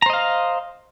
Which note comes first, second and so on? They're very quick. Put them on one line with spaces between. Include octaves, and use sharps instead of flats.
A#5 C5 D#5 F5